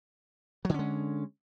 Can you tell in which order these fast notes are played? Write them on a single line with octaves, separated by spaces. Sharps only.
F#3 D3 C#4 G#3